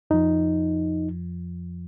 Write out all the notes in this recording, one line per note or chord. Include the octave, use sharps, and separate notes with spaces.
F2 F3 D#4